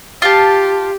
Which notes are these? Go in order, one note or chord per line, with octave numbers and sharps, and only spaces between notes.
F4 G4 A5